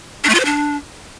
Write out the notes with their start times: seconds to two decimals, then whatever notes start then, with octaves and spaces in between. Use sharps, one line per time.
0.24 D4
0.29 A3
0.35 F4
0.40 C5
0.45 D4